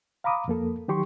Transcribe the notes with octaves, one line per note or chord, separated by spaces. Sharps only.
F5 A#5 B5 D6 D#6
F2 A#3 A4
D#3 F#3 G4 C6 C#6